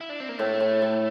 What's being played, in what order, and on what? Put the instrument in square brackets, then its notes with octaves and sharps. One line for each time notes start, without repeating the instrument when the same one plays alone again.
[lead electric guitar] E4
D4
C4
A#3
[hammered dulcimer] A2 [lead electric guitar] A3
[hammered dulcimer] A2
A2